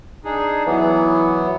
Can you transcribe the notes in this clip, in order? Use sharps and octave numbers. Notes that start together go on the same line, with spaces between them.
D4 D#4 G#4
E3 F#3 B3